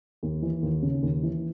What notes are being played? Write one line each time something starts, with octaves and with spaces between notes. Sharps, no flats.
D#2
E3
D#2
C#3
D#2
E3